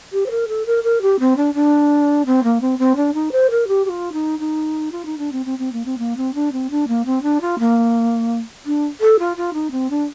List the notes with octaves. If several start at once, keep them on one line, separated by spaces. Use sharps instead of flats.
G4
C5
A#4
A4
A#4
A#4
G4
C4
D4
D4
C4
A#3
C4
C4
D4
D#4
C5
A#4
G4
G4
F4
D#4
D#4
F4
D#4
D4
C4
C4
C4
A#3
C4
A#3
C4
D4
C4
D4
A#3
C4
D4
F4
A#3
D4
A4
F4
F4
D#4
C4
D4